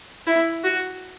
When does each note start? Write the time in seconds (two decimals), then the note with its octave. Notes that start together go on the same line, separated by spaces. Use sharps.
0.27 E4
0.64 F#4